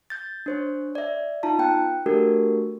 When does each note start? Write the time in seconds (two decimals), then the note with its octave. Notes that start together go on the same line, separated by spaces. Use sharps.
0.10 G6 A6
0.46 D4 C5 C#5
0.95 D5 E5
1.43 D#4 F4 A5 A#5
1.58 B3 G5 F#6
2.06 A3 D4 F#4 G4 A4 A#4